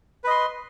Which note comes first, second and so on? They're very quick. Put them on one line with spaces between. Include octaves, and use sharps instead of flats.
B4 D#5 C6